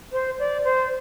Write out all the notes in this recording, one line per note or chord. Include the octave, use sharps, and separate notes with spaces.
C5
D5
C5